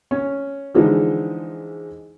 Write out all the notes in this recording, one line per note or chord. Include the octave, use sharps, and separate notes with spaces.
C#4
D3 E3 F3 G#3 D#4